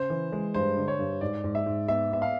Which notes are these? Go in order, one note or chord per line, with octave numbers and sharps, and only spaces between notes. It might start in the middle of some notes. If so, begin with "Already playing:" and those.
Already playing: C#3 C5
E3
G#3
G2 C5
D3
C#5
G2
G#2 D5
G#2
E5
G#2
B3 E5
B3 E5
F5